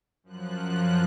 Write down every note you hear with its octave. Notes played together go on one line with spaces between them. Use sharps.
F#2 F3 F#6